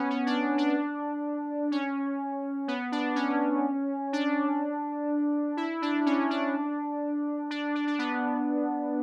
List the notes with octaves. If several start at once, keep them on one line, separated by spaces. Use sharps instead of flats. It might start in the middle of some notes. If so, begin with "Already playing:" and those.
Already playing: B3 C#4
C#4
D4
D4
C#4
B3
D4
C#4
D4
E4
D4
C#4
D4
D4
D4
D4
B3